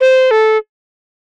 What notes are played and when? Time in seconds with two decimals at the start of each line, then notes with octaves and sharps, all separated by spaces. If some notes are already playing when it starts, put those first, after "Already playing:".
0.01 C5
0.31 A4